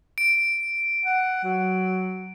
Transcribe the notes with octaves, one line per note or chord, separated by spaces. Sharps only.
D7
F#5
F#3